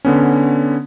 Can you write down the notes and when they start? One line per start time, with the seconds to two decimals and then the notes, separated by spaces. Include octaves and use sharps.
0.05 D3 B3 C#4